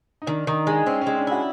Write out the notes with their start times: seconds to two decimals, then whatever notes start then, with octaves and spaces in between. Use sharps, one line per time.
0.22 D#4
0.27 D#3 D4
0.47 D#3 D#4
0.67 G#3 D4
0.86 C4 C#4
1.01 C#4
1.07 G#3
1.17 D4
1.27 E4 F#4